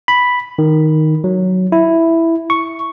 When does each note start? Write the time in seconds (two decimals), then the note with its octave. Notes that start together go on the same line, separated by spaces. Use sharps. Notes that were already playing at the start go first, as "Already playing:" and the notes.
0.08 B5
0.59 D#3
1.24 F#3
1.72 E4
2.50 C#6